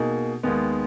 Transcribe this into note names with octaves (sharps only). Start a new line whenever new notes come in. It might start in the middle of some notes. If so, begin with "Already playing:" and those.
Already playing: B2 A#3 D#4 G#4
D#2 D#3 G#3 B3